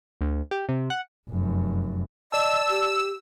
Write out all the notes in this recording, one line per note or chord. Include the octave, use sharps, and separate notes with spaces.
D2
G4
C3
F#5
F1 F#2
D5 D#5 A5 E6
G4